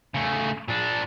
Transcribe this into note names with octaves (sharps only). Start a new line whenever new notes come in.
C#3 A3
A#2 D4